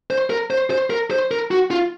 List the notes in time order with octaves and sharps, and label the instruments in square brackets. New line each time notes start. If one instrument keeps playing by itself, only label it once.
[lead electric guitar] C5
A#4
C5
C5
A#4
C5
A#4
F#4
F4